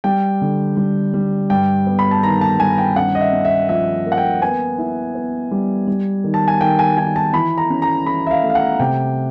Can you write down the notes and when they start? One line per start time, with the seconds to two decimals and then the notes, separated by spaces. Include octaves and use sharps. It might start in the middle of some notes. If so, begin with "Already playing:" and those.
0.04 G3 G5
0.41 D3
0.77 G3
1.14 G3
1.50 G2 G5
1.87 B3
1.99 B5
2.11 A5
2.23 D#3 A#5
2.41 A5
2.59 G2 G#5
2.78 G5
2.96 C#4 F#5
3.15 D#5
3.21 E5
3.32 C#4
3.45 E5
3.69 F3 E5
4.06 A#3
4.12 F#5
4.18 G5
4.42 B3 G#5
4.78 E4
5.15 B3
5.51 G3
5.88 G3
6.24 D#3
6.34 A5
6.48 G#5
6.61 D#3 G5
6.79 G#5
6.97 D#3 G#5
7.16 A5
7.33 E3 B5
7.58 A#5
7.70 C#4
7.82 A#5
8.06 E3 B5
8.27 E5
8.31 F5
8.43 A3
8.50 F5
8.55 F#5
8.79 C3 G5